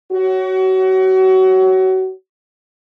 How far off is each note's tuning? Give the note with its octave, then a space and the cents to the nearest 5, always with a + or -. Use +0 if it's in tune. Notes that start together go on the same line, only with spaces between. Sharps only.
F#4 +30 C#5 +0